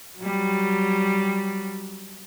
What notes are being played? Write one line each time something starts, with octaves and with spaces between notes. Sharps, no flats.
F#3 G3